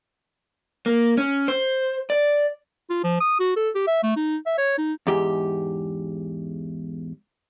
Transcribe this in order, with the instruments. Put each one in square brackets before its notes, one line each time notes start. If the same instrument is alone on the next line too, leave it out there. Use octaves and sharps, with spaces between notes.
[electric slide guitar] A#3
C#4
C5
D5
[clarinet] F4
F3
D#6
F#4
A4
G4
E5
A3
D#4
E5
C#5
D#4
[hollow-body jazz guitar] E2 G#2 G4